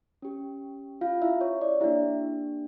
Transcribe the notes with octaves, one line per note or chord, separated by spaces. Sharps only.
C#4 G4
F4 F5
E4 E5
C#5
D5
A#3 D4 E4 G4 E5